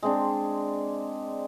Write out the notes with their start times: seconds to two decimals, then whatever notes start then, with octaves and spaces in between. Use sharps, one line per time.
0.03 G#3 C4 D4